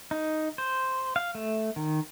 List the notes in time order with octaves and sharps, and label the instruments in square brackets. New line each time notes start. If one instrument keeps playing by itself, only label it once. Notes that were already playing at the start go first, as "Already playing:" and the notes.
[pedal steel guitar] D#4
C5
F5
A3
D#3